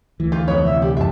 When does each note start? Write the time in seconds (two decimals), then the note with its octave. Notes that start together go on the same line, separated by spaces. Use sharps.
0.20 D2 E3
0.32 F4 G4
0.48 F2 B3 C#5
0.64 C2 E5
0.82 G3 G4
0.97 F#2 E5 A5